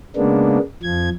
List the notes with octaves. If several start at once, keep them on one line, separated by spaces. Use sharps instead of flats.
C#3 G#3 A#3 B3 D4
F2 F3 G#6